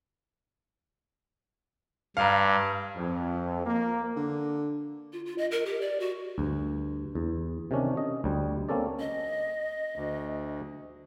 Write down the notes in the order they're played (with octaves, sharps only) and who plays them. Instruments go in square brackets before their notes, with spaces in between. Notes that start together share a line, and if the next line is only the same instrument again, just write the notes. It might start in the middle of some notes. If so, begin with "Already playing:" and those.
[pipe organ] G2 [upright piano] F5 A#5
[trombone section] F2
A#3
[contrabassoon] D3
[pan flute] F4
F4
D#5
A#4
G4
D5
F#4
[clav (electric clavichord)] D2 G2
E2
C3 D#3 C#4 D4
D#5
D2 G3
A#3 C4 C#4 A4 D5
[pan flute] D#5
[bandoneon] D2